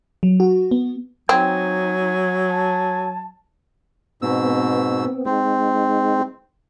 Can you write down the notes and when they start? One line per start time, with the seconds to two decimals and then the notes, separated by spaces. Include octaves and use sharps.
0.23 F#3
0.40 F#4
0.71 B3
1.29 F#3 C4 D#4 G#5
2.49 A5
4.22 G#2 B2 B3 C4 E6
5.26 G#3 C4 D#4